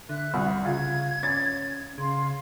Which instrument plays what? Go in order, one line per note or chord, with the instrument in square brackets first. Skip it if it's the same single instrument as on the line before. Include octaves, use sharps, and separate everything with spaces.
[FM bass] D3 [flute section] E5 F#6
[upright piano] C2 [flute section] C#6
[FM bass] C#3 [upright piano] F4 [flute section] G#6
[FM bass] C#4 [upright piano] A6
[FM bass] C#3 [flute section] F5 C6